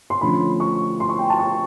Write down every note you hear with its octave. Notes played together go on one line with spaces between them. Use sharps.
C6
D3 F3 A3 C#4 B5
C#6
C6
C#6
G5
A5
C#6